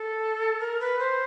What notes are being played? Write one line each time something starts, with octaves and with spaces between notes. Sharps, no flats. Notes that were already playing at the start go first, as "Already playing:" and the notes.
Already playing: A4
A#4
B4
C5